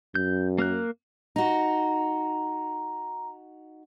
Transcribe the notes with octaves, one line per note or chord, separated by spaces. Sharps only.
F#2 G6
A#3 A#4 F#6
D#4 F#4 A#5